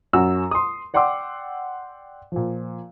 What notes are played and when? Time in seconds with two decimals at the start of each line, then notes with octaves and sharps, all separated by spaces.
0.13 F#2 F#4 E6
0.51 C6 D#6
0.94 D5 F#5 G5 C6 D6 E6
2.32 A#2 F3